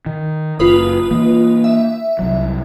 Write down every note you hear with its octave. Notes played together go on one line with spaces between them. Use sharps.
D#3
F#1 F4 B4 D#6
E3 A#3
E5
C2 F#3